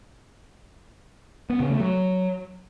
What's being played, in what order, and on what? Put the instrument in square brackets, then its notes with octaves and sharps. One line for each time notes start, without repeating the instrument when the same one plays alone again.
[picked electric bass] B3
C#3
A3
F#3